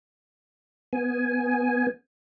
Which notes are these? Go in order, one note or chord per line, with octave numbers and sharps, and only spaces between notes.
B3 G#5